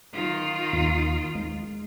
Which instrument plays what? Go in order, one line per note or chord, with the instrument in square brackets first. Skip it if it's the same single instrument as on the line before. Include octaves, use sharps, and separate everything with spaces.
[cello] D#3 F4
[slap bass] D#2
G#3